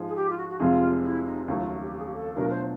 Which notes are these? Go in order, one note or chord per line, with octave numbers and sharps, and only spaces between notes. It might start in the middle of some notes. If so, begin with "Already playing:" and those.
Already playing: G#2 F3 G#3
G#4
G4
F4
F#4
F#4
F1 F2 C3 F3 G#3 F4
E4
D#4
D#2 C#3 F#3 A3 E4
F4
F#4
G4
G4
G#4
G4
A4
B2 F#3 A3 D4 F4 A#4
C5